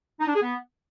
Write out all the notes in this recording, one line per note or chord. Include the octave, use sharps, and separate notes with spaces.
D#4
D4
G#4
B3